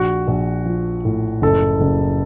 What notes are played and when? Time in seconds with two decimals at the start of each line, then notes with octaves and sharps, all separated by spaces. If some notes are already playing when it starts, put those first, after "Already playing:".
Already playing: A#1 F#4
0.28 A#1
0.65 F3
1.05 A2
1.42 F#1 A4
1.81 F#1